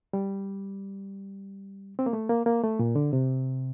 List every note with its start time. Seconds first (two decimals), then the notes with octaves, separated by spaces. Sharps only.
0.13 G3
1.99 C4
2.06 A#3
2.13 A3
2.29 A#3
2.46 A#3
2.63 A3
2.79 A#2
2.96 D3
3.13 C3